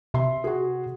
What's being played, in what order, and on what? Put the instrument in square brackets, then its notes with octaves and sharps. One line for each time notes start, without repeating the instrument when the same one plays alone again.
[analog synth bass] C3 [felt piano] E5 C6
[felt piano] F#4 G#4